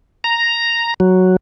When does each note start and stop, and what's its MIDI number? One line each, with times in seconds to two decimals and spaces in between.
0.24 0.94 82
1.00 1.36 54